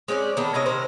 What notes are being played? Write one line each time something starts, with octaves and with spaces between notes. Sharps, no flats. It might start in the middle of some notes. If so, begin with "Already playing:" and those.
G#3 C4 C#4 D5
D#3 B3 A4
C3 D#3 C#4 D#5
C3 D#3 A#4 C5